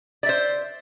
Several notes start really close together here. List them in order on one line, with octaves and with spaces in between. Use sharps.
D5 E5 C5